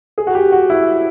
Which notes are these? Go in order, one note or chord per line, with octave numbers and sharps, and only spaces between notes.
G#4
F#4
G4
F#4
E4